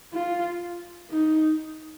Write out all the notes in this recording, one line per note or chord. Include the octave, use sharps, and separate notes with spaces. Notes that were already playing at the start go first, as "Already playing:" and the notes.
F4
D#4